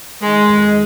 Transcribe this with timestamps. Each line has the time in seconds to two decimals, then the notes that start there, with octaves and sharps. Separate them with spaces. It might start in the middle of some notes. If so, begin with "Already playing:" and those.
0.22 D#3 G#3
0.49 F2